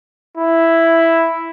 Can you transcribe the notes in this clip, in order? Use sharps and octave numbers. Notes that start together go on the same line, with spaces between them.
E4